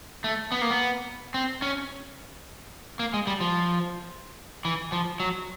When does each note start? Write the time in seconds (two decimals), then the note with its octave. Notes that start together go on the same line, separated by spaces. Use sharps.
0.24 A3
0.52 B3
0.61 A#3
0.70 B3
1.34 C4
1.62 C#4
2.99 A#3
3.14 G#3
3.27 G3
3.41 F3
4.65 E3
4.92 F3
5.20 F#3